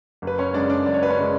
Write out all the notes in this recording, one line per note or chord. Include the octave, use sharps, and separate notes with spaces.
F#1
B4
C#4 C#5
F#2 C#3 G#3 D4 D5
D4 D5
F#1 D5
C#5
B4
C#4 C#5
C#3 G#3